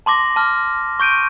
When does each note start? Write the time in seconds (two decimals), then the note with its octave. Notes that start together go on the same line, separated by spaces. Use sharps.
0.06 A5 C6 D6 A#6
0.36 A5 F6
1.00 C#6 G6 D7 D#7